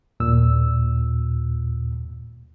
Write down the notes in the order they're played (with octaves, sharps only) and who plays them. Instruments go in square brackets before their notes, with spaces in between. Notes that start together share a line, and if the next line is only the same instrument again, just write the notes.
[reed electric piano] D#2 A#2 E6